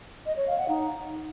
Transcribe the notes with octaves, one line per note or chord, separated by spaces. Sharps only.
D#5
C#5
F5
F#5
D#4